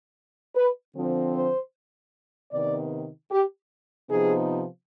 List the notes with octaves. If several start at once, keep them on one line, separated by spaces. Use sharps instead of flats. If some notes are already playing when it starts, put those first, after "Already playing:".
B4
D3 F3 C4
C5
C3 D#3 B3 D5
G4
C3 F3 B3 D#4 G#4